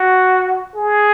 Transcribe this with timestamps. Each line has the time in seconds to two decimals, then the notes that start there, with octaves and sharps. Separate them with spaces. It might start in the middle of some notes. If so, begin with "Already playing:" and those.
Already playing: F#4
0.76 G#4